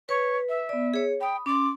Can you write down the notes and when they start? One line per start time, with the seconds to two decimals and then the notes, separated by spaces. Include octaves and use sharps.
0.09 B4 C#5
0.49 E5
0.69 B3 D5
0.94 G#4 C#5
1.21 G5 B5 D#6
1.46 C#4 C6 D6